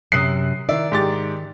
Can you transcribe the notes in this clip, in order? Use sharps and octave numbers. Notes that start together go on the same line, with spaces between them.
F#2 C3 D#6 F#6 C7
D#3 E4 D5
G#2 G4 A6